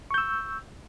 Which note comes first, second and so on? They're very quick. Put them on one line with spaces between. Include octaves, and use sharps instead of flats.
C#6 G6 E6